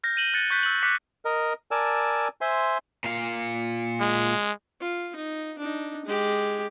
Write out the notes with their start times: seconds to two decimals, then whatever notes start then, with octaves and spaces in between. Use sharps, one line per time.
0.04 F6 G6 A#6
0.16 G6 D#7 E7 F#7 G7
0.34 F#6 A6 C#7
0.50 C#6 F#6 G6 B6
0.63 E6 F#7
0.83 D6 F#6 B6 C#7
1.25 A#4 D#5
1.71 A#4 D5 G#5 A5 E6
2.41 C5 E5 G#5 C6
3.04 A#2 F5
4.01 G#3
4.81 F4
5.16 D#4
5.59 D4 D#4
6.06 G#3 G4